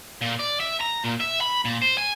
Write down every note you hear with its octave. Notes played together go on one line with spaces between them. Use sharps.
A#2
D5
E5
A#5
A#2
E5
B5
A#2
C5
G#5